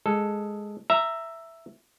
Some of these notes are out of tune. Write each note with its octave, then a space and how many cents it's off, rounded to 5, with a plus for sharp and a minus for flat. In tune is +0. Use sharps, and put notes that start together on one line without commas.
G#3 +0 A4 +0
E5 +5 A#5 -10